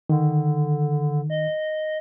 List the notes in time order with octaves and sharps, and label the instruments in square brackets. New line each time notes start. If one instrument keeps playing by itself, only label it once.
[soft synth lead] D3 [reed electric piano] D#3
[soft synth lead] D#5